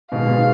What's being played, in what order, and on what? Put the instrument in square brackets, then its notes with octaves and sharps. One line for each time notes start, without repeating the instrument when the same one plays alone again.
[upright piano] G#2 B2 [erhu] F5
[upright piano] G#2 B2